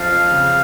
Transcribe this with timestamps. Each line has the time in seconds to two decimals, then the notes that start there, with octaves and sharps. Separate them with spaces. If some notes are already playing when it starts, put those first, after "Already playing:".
Already playing: F2 F3 F5
0.31 C#3